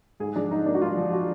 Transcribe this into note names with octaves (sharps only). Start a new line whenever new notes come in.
G#2 G#4
F3 D4
G#2 D#4
A#3 D4
F#4
G#2 F4
F3
F#4